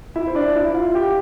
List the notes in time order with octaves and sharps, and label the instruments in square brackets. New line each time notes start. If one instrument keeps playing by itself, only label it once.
[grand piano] E4 E5
C5
D4 D5
E4 E5
F4 F5
G4 G5